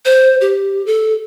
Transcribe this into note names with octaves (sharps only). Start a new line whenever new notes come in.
C5
G4
A4